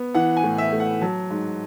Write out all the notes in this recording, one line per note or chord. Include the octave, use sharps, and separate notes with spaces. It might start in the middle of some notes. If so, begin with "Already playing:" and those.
Already playing: B3
E3 F#5
G#5
A2
E5
A3
F#5
F#3 A5
G#2